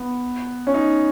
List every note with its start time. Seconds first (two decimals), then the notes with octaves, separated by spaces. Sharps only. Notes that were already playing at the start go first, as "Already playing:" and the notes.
Already playing: B3
0.67 C#4
0.74 D#4